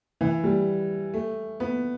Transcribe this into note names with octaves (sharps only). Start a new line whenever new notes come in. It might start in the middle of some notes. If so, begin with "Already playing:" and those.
E3
G3
A3
B3